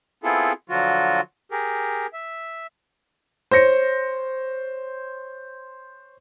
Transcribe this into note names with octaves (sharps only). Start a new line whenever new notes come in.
B3 C4 E4 F4 G#4 A4
D3 F3 F#3 F4 F#4
G4 G#4 A#4
E5
C5 C#5 A#6 C#7